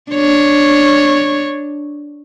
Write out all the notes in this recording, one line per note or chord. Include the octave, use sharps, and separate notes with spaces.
D4 C#5